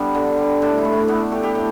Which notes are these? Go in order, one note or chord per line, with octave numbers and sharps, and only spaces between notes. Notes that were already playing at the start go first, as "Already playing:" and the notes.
Already playing: G3 B3 D4 E4 G4 A4
D3
G3
A2 D4
E4
A3
E4
A3 B3
D4
A3 G4
G4
A2